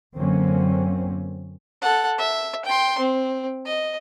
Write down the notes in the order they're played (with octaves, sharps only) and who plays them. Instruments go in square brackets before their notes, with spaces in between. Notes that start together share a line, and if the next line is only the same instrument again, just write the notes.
[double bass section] F#2 D3 F#3 A#3 C4 C#4
[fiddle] A4 F#5
E5
G5 C6
C4
D#5